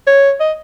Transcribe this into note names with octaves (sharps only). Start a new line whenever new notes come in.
C#5
D#5